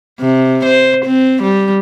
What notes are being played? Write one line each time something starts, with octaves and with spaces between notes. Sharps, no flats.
C3
C5
C4
G3